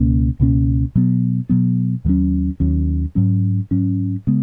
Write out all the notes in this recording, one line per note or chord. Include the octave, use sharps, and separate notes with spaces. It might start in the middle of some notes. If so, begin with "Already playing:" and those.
Already playing: C#2 B2 A#3 C#4
C#2 B2 A#3 C#4
B2 F#3 B3
B2 F#3 B3
D#2 D#3 F#3 C#4
D#2 D#3 F#3 C#4
G#2 F#3 C#4
G#2 F#3 C#4
C#3 G#3 B3